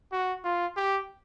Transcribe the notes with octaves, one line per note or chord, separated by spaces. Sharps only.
F#4
F4
G4